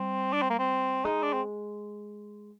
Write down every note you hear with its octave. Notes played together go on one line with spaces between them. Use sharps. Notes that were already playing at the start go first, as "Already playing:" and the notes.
Already playing: G3 C4
D4
C4
A#3
C4
G#3 D#4
D4
C4